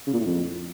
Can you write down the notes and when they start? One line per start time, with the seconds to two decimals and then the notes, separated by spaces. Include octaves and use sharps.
0.07 C#3
0.13 A#2
0.20 A2
0.26 F2